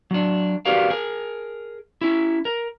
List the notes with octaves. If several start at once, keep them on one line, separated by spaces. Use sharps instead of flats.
F#3 D4
F#4 G4 A#4 B4 D5 F5
G#4 A#4
C#4 E4
A#4